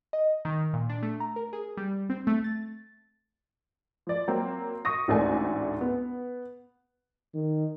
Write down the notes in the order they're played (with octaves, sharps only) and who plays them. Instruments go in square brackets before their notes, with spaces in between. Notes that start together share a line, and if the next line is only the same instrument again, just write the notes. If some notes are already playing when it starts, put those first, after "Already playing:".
[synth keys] D#5
D#3
A#2
D4
A3
A#5
A#4
G#4
G3
C4
A3
A6
[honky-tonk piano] F3 D5
F#3 A#3 C4
C#6 D#6 A#6
A1 D2 G#2 A3 D4 G#5
B3
[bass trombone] D#3